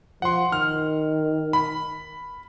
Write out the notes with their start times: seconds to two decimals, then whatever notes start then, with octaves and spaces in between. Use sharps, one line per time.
0.22 F3 F#5 C6
0.52 D#3 F6
1.53 B5